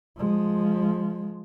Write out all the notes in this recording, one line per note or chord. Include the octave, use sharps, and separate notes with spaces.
F3 G#3